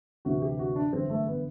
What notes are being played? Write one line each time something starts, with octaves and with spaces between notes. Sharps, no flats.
D2 C3 E3 F#4
G4
F#4
D4
G1 F#2 E3 C4
A3
B3